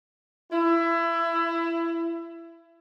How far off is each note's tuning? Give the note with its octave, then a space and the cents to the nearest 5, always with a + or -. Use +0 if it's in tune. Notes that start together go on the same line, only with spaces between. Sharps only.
E4 +25